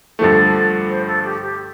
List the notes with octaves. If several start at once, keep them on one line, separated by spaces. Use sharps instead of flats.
G2 D3 F3 A3 A4
C5
A4
G4
G4